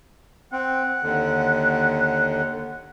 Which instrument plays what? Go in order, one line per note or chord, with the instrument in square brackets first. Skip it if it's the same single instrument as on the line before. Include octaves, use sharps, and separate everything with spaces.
[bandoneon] C4 [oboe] F#5
[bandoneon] D#2 D3